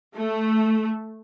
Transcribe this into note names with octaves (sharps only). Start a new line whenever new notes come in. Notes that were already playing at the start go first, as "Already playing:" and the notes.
A3